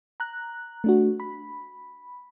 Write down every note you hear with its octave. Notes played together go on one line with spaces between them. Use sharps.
A#5 F#6
A3 D4 F#4
B5